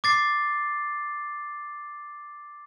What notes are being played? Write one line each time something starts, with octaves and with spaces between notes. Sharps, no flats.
D6 A6 C7